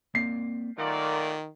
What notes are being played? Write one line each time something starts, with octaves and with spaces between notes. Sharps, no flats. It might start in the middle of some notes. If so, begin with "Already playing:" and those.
A#3 C4 D5 C7
A#2 D#3 A3 A#4 D5 F5 F#5